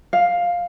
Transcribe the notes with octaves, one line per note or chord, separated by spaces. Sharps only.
F5